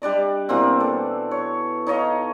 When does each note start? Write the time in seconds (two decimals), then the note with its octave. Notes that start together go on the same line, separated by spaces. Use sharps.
0.02 G3 D4 D5 D#5
0.49 B2 E3 A#3 C4
0.80 A4
1.31 C#5
1.87 D#4 C#5 D#5 F5